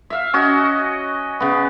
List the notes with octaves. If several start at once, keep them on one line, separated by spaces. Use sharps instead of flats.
E5 F5
C#4 F#4 D#5
C#3 B3